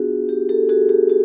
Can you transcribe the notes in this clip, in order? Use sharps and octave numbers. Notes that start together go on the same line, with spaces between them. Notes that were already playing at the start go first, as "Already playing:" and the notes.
Already playing: B3 D4 F4 F#4 G#4
G4
G4 A4
F#4 G#4
G4
F#4 G#4